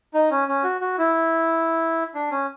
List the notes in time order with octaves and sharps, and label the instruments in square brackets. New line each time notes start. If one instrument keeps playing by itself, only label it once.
[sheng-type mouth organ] D#4
C#4
C#4
F#4
F#4
E4
D4
C#4